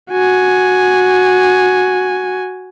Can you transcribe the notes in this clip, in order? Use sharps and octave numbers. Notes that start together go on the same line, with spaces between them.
F#4 G#5